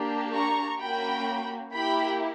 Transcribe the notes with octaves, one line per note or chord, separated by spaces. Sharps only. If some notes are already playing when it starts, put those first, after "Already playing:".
Already playing: A#3 D4 G4
A#5 C#6
A#3 C#4 F#4 G5 B5
A#3 E4 G4 G5 B5